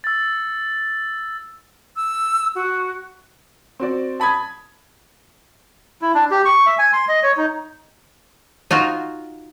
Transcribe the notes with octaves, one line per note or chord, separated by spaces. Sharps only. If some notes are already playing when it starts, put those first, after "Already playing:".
E6 A6
E6
F#4
C4 F#4 D5
A5 B5 D#6 G#6
E4
D4
G4
C#6
E5
G#5
C6
D#5
C#5
D#4
D#4 F4 F#4